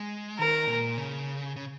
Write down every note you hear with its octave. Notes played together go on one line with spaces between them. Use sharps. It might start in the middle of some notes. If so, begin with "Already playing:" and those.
Already playing: G#3
D#3 A#4
A#2
C#3
C#3